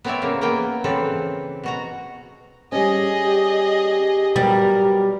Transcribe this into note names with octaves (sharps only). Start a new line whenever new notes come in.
B3 C4 E4 C#5 D5 E5
C#3 A#3
A#3 B3 G5
C#3 E3 C4 A4 B4
B2 F#4 A#5
G3 C#4 G#4 D#5
G4
F#3 G3 B3 A#4